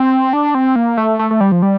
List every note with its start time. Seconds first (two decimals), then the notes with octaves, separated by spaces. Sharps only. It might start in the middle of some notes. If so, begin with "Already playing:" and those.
Already playing: C4
0.33 D4
0.55 C4
0.76 A#3
0.97 A3
1.19 A3
1.31 A3
1.41 G3
1.52 F3
1.62 G3